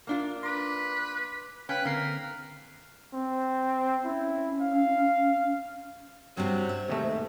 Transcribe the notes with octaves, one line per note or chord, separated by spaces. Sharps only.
A#3 D4 F4
B4 C6 D6
C#4 B4 F5 G5 B5
D3 A#3 C4 A#4 C7
C4
C#4 E4
F5
G2 C3 F#3 C4 C5
E5
D#2 G#2 C3 A3